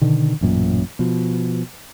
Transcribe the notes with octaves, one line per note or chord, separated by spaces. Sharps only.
B2 D3 D#3
A1 F#2 A#2
B2 F3